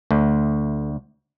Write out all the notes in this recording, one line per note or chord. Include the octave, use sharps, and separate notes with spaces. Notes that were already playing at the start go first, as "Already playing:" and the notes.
D2 A3